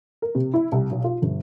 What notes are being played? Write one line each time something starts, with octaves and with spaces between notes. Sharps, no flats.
A#4
C3
E4
C2
B1
F4
G1